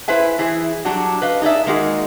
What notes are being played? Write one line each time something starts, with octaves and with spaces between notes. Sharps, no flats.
E4 B4 C5 E5 G#5
E3 E4 G#4
F#3 G3 D4 F#4
B4 D#5 F5
D#4 G#4 D5 E5
D#3 G#3 A#3 D#4 F#4 G#4